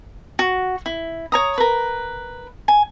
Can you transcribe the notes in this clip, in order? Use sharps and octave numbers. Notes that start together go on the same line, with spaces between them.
F#4
E4
C#5 A#5 D#6
A#4 B4
G#5